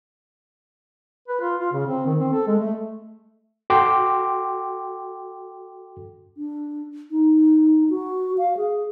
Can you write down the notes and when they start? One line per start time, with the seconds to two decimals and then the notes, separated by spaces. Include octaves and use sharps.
1.28 B4
1.41 F4
1.60 F4
1.73 C#3
1.87 C4
2.06 D#3
2.20 C4
2.32 A4
2.47 G#3
2.59 A3
3.70 F#4 A4 G5 C6 D6
6.37 D4
7.11 D#4
7.90 F#4
8.38 F5
8.57 G#4